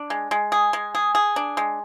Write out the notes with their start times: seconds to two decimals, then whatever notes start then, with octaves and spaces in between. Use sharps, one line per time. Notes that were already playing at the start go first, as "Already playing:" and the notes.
Already playing: D4
0.10 G#3
0.31 G#3
0.52 G#4
0.73 G#3
0.95 G#4
1.15 G#4
1.36 D4
1.57 G#3